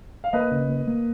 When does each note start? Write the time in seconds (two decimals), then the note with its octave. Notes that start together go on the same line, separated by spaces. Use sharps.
0.24 F5
0.33 A#3 B4 D#5
0.51 C#3
0.69 A#3
0.87 A#3